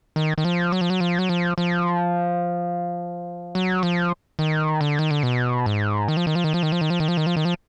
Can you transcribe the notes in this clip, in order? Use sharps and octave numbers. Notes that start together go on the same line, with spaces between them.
D#3
D#3
F3
F#3
F3
F#3
F3
F#3
F3
F3
F#3
F3
D#3
D3
D#3
D3
B2
G#2
D#3
F3
D#3
F3
D#3
F3
D#3
F3
D#3
F3
D#3
F3
D#3
F3
D#3
F3